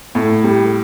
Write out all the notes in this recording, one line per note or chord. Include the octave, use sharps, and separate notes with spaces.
A2
G3